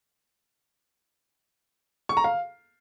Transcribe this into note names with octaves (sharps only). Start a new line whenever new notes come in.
C#6
A#5
F5